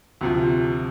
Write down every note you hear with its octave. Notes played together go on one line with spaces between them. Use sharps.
D2 C3 F3